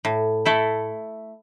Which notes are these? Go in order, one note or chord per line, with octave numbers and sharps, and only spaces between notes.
A2
A3 E4 A4